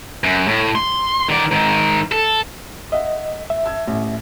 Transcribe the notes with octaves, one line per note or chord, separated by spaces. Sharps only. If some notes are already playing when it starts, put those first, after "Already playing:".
F#2
A2
C6
D#3 D5
G#2 D#3
A4
D#5 E5 F#5
E5
A5 E6 G#6
A1